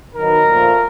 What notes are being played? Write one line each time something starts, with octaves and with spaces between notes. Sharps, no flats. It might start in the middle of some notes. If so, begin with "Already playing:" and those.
D#3 F#3 B3 D#4 A#4
A#2 F3 A3